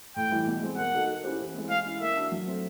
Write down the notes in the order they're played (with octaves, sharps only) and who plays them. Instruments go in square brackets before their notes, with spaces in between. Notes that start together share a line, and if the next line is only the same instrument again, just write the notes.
[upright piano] A2 [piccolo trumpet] G5
[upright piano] E3 G3
B2
G#3 C4
[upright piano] A#3 [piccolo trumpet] F#5
[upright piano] D#4 F#4 A4
A#3
C#4 E4 G4 C5
E3
G#3 C4
[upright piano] G#3 [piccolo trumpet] F5
[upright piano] C#4 E4
[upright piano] A#3 [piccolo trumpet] E5
[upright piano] D4 F#4
F#3
A3 C4